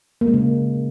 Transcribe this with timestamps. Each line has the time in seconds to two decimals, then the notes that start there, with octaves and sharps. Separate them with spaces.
0.21 A#3
0.27 G#3
0.34 C#3